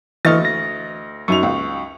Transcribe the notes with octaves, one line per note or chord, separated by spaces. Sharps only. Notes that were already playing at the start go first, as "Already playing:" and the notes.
D2 E3 D#5 C#6 F6 A6
A#6
F#2 D#4 C#6 F7
C#2